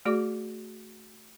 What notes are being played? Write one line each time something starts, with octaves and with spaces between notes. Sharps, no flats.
A3 F#4 G#4 D5 D6